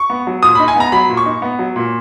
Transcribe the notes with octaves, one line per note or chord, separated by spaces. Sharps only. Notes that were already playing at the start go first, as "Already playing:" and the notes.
Already playing: C#6
B3
F#3
A#2 D#6
B5
D#4
G#5
B3 A#5
F#3 B5
A#2
C#6
D#4
B3
F#3
A#2